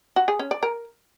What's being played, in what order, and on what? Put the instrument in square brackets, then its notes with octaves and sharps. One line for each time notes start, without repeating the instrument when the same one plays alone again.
[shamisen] F#4
G#4
C#4
D5
A#4